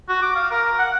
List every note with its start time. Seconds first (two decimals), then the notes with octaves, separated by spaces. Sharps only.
0.09 F#4
0.22 D6
0.36 F5
0.51 A#4
0.79 F#5